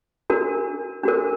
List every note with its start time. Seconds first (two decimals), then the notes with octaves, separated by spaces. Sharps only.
0.30 D4 F#4 A#4
1.03 D4 F#4 A#4